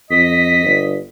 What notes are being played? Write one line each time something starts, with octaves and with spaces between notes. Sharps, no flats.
F2 D#5 B6
G1